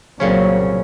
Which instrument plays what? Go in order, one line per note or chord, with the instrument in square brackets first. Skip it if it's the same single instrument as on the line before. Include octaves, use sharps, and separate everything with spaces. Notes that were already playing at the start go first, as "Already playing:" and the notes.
[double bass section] C2 A#3 C4 [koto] A#2 C#3 C#4 [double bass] F#3